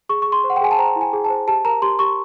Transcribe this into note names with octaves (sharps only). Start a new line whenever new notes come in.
G#4 C#6
G#4 C#6
C6
C5
F#5
G5
G#4 G#5
A5
C5 A#5
E4
G#5
G#4
A5
C5
G4 A5
A#4 A#5
G4 C6
G4 C#6